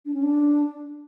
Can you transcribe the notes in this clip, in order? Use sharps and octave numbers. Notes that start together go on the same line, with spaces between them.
D4
C#4
D4